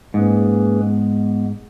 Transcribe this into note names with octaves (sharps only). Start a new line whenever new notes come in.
G#2 A#3 C#4 G#4 B4
G#3 B3